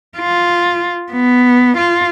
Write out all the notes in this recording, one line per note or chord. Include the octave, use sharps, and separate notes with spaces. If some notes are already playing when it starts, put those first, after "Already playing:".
F4
B3
F4